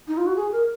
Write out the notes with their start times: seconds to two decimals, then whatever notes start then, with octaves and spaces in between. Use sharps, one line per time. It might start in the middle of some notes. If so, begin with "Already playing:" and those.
0.08 D#4
0.17 F4
0.26 F#4
0.36 G#4
0.52 A#4